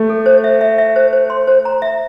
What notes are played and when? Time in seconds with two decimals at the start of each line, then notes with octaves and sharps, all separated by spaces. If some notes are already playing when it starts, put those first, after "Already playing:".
Already playing: A3
0.09 A4
0.26 C5
0.44 E5
0.61 E5
0.78 E5
0.96 C5
1.13 C5
1.30 C6
1.47 C5
1.65 A#5
1.82 E5